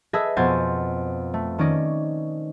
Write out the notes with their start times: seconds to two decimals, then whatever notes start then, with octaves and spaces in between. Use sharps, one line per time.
0.13 G#4 A4 B4 D#5 E5
0.37 F2 B2 B3 C5 G#5 A6
1.34 A3
1.58 D#3 C#4 D5 D#5